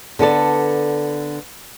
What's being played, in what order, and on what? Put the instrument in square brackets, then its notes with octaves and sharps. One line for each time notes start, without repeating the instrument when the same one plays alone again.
[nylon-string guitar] D3 B3 A4 D5